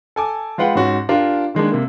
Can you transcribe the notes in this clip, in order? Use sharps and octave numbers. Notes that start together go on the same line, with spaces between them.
A4 G#5 D6
G#3 F4 B4 F#5 G5
G#2 C#4 F#4
D4 F4 G4 A#4
D#3 G#3 A#3 D4
C3 A#3